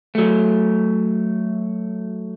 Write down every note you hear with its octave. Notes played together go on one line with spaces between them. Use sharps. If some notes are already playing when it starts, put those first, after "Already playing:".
F#3 A3